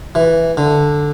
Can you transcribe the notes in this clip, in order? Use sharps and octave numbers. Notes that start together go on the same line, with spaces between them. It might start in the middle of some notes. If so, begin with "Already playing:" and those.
E3
D3